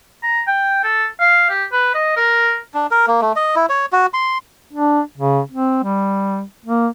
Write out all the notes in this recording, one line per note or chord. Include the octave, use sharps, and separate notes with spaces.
A#5
G5
A4
F5
G4
B4
D#5
A#4
D4
A#4
A#3
A3
D#5
E4
C#5
F#4
C6
D4
C#3
C4
G3
A#3